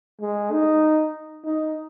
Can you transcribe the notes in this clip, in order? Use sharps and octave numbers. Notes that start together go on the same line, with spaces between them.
G#3
D#4
D#4